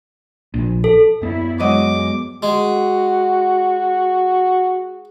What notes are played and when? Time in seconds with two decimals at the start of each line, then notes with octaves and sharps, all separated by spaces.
0.54 A#1
0.84 A4
1.22 F#2 B3 E4
1.60 F#3 G#3 D#5 D6
2.43 G#3 F#4